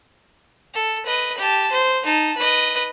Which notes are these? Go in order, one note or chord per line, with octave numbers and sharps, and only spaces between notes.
A4
B4 D#5
G4 A5
C5
D#4 A5
B4 D#5